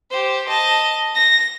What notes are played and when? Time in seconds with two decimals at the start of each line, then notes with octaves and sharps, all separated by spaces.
0.11 G4 C5
0.49 D#5 A5
1.15 A#6